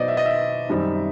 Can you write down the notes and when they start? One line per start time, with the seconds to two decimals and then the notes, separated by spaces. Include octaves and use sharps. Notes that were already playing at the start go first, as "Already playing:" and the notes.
Already playing: B2 F#3 B3 D#4 C5 D5 D#5
0.08 E5
0.17 D#5
0.26 E5
0.69 F#2 D#3 G3 C4 D#4